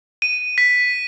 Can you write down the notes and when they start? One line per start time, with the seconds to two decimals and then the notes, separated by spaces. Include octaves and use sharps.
0.22 D#7
0.58 B6